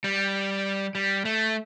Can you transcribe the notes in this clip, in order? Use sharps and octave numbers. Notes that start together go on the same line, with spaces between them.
G3
G3
A3